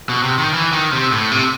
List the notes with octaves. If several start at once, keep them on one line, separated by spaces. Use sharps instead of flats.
B2
C3
D#3
E3
D#3
C3
A2
C3